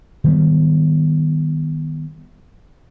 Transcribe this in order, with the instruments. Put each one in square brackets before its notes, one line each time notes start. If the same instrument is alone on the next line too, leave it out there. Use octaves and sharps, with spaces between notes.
[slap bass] D#3 G3 B3